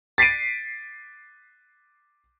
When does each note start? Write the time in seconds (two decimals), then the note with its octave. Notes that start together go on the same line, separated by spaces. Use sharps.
0.18 A6 B6 C7 D7 D#7